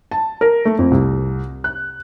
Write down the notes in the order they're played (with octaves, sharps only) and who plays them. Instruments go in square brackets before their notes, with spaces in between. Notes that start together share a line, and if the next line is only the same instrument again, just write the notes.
[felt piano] A5
A#4
A3
F2
C2
F#6